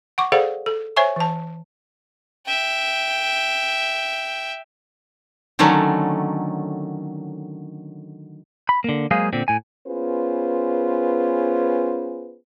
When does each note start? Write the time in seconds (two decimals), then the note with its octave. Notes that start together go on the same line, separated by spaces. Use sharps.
0.18 F#5 C#6 D6
0.32 G#4 A4 C5 D5 F5 F#5
0.66 A4
0.96 C5 C#5 E5 G#5 C#6
1.16 E3 A5
2.46 E5 G5
5.59 D3 D#3 F#3 A3 C#4
8.69 B5
8.84 D3 A#3
9.11 F#3 G#3 A#3 G#4 C5 F5
9.33 A#2 D3 C4
9.48 A2 G#5
9.87 B3 C#4 F4 G#4 B4 C5